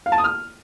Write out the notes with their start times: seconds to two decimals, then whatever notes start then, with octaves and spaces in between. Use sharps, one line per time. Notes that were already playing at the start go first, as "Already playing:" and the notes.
0.06 F5
0.12 A5
0.18 D#6
0.24 F6